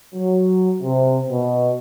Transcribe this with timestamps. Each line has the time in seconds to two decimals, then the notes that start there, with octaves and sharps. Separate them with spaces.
0.15 F#3
0.82 C3
1.30 B2